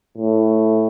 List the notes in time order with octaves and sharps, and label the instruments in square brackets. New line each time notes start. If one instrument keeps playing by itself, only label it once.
[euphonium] A2